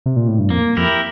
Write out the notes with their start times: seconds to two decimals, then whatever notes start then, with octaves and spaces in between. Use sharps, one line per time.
0.06 C3
0.16 A#2
0.28 A2
0.39 G2
0.50 F2 A#3
0.77 F2 E4 G4 A#4